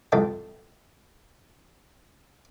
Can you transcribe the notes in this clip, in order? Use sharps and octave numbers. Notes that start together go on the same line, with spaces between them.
C2 F2 G#2 D4 A4 G5